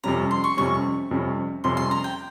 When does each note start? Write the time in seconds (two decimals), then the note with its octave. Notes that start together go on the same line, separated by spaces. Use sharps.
0.04 F2 C3 G3 C#4 A#5
0.31 C6
0.44 C#6
0.57 F2 C3 G3 C#4 C#6
1.11 F2 C3 G3 C#4
1.64 F2 C3 G3 C#4 C6
1.77 C6
1.91 A#5
2.04 G5